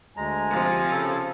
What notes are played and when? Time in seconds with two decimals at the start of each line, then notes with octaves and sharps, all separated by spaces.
0.17 D2 G#3 G#5 A#5
0.49 C3 F3
0.91 C#3 A4